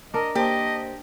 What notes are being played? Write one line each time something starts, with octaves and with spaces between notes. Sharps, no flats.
D4 A#4 D#5
A#3 G4 C5 D#5 A5